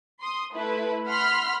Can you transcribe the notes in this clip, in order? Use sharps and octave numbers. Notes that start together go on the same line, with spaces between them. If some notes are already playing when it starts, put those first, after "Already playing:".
C6 D#6
A3 E4 B4
F#5 B5 C6 F6 B6